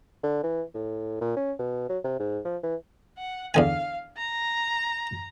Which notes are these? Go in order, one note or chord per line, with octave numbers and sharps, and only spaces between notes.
D3
E3
A2
A#2
C#4
B2
F#3
C3
G#2
F3
E3
F#5
E2 D3 F5 G#5
A#5